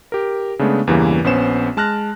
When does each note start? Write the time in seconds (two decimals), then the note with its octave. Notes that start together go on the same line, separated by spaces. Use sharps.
0.12 G4 A#4
0.59 C#3 G#3 A3 B3 D4
0.87 E2 G2 C#3 E3 G3 A#3
1.24 A#1 B3 C#4 C5 E7
1.77 G#3 A5 F6 F#6 A#6